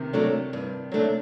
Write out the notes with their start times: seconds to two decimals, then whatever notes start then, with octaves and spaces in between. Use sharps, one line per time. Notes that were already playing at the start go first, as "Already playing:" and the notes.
Already playing: C3 D#3
0.13 F#3 A3 D4
0.53 G2
0.92 F#3 A3 D4